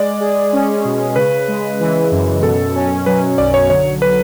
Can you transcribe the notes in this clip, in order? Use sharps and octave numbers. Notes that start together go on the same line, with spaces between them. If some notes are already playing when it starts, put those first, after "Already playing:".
Already playing: G#3 D5
G#4
C#4
B2
C#3 B4
G#3
E3
F#2
B2 A4
C#4
F#3 B4
B1 D5
C#5
D3 C#5
B4